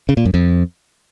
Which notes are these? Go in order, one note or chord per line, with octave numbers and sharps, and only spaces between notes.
C#3
A#2
F#2
F2